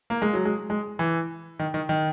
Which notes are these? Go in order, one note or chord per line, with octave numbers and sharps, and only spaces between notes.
A#3
G#3
F#3
G#3
G#3
E3
D#3
D#3
D#3